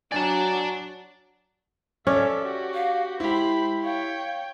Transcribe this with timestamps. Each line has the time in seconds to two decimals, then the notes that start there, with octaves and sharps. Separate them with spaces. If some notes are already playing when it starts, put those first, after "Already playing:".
0.12 F#3 D4 D5 G#5 A5
2.07 C#4 A4 C#5 D5 E5 D6
2.44 F#4 G4
2.74 F5
3.20 G#3 E4 G4 C5 B5
3.83 C#5 F5 G5